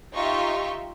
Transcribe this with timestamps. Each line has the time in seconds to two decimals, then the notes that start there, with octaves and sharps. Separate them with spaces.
0.14 D#4 F4 G4 E5 C6 C#6